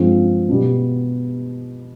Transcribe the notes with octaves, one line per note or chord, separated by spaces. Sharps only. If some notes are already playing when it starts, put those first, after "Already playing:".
Already playing: G2 F3 G#3 C4 F4
B2 G3 B3